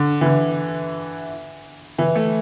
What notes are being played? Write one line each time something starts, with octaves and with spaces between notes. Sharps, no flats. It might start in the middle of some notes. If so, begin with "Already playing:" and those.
Already playing: D3
E3
D3
E3
A3